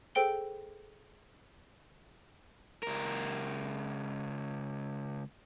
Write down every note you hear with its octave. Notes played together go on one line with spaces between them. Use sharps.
G#4 A4 C5 G5 D7 G7
C#2 A#4